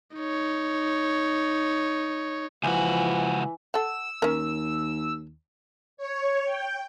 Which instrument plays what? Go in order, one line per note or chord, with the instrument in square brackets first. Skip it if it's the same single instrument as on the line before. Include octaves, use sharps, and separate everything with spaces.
[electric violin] D#4 C#5
[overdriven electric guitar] C#2 F#4 [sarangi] E3 [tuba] F3 [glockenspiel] G#5
[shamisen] A4 F#5 [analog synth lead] E6
[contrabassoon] D#2 [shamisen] C#4 A#4
[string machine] C#5
G5